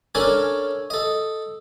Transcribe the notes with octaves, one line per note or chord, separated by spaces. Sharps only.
C#4 D4 A4 A#4 G#5
A4 D#5